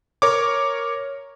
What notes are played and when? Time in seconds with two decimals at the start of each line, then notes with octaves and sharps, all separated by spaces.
0.22 A#4 C#5 D6